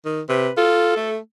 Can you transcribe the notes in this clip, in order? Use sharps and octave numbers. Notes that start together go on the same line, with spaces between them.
D#3
C3 B4
F4 A4
A3